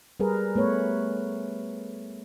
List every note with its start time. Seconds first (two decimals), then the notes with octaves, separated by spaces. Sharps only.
0.20 G3 G#4 A#4 B4
0.56 A3 B3 B4 C#5